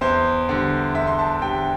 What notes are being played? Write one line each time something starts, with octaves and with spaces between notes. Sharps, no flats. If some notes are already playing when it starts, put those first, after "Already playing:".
E2 C5
D3 G3
E2 E5
C6
A5
D3 G3 G5